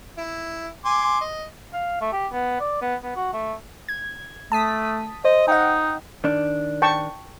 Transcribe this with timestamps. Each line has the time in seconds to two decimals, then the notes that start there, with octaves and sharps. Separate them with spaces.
0.17 E4
0.85 G#5 C6 D6
1.21 D#5
1.73 F5
2.01 A3
2.12 G4
2.32 B3
2.60 D5
2.81 B3
3.03 B3
3.16 F#4
3.33 A3
3.89 G#6
4.52 A3 A5 D#6 B6
5.25 C5 D#5
5.48 D#4 D#5 F#5 G5
6.24 D#3 D4
6.82 G5 A5 C#6